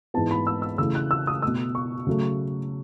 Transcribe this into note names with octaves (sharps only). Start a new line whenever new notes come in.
G#2 E3 G#3 B3 A5
B5
E6
E6
C#3 E3 A3 E6
F#6
E6
D#6
B2 A3 E6
C#6
C#3 F#3 A3